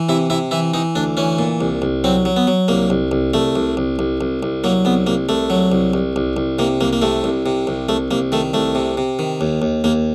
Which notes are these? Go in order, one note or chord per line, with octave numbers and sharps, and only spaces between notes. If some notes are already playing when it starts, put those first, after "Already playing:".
Already playing: E3
C3 E4
C3 E4
E3 E4
E3 D#4
D2 D4
E3 C#4
A#2
C2
C2
F#3 C4
F#3
B3
F#3
C2 A#3
C2
C2
C2 A3
C2
C2
C2
C2
C2
F#3 A#3
C2 B3
C2 A#3
C2 A3
F#3
C2
C2
C2
C2
C3 A#3
C2 A#3
A#3
C3 A3
C2
C3
C2
C2 A3
C2 A#3
D#3 A3
C2 A3
C3
C3
D#3
D#2
D#2
D#2 A#3